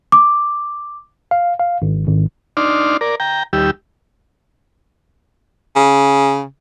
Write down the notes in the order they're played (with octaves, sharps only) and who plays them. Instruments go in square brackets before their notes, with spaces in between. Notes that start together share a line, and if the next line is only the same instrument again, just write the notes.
[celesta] D6
[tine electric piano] F5
F5
G#1
G#1
[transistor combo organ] D4 D#4 D5 C6 F6
A#4 D5
G5 A#5
D#2 G3 G4 E6
[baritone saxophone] C#3